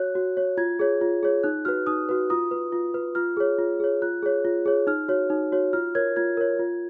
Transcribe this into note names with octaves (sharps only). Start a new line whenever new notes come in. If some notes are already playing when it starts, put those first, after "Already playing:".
Already playing: F#4 C#5 F#6
F#4
C#5
F4 G#6
G#4 C#5
F4
G#4 C#5
D#4 F#6
F#4 B4 F6
D#4 D#6
F#4 B4
F4 D#6
B4
F4
B4
F4 F6
G#4 C#5
F4
G#4 C#5
F4 F#6
G#4 C#5
F4
G#4 C#5
D#4 F6
F#4 C#5
D#4
F#4 C#5
F4 F6
A#4 C#5 G#6
F4 G#6
A#4 C#5
F4